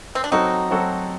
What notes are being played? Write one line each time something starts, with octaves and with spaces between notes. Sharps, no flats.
C4
D4
F#3 C4 D#4 F#4 A4
F#3 C4 F#4 A4